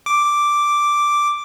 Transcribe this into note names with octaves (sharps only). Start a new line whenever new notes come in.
D6